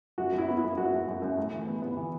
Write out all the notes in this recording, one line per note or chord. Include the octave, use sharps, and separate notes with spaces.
F#2 F#4
F#2
E4
B3
E4
F#2
F#2 F#4
F#2
F#2
F#2
A2
E3
B3
B3
E3